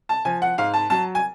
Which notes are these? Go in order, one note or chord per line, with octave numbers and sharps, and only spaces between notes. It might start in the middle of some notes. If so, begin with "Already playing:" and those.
A5
F3 G#5
F#5
G#2 F5
A5
F#3 A5
G#5